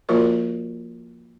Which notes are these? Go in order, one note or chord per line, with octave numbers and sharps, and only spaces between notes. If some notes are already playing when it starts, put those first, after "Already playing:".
F3 A#3 F4 F#4 A#4 D5